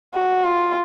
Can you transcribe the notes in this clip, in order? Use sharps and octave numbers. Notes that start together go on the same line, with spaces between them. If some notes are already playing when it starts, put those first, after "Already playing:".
F#4
F4